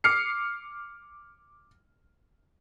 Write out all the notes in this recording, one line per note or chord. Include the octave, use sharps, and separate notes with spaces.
D6 F6 C7 C#7